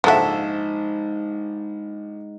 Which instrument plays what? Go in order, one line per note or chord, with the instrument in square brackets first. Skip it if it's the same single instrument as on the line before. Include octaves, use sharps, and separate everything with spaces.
[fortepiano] A#1 A4 E5 [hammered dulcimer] G#2 [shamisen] F3 F#4